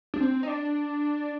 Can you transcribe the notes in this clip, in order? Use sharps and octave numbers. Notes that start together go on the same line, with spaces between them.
D4
C4
D#4
D4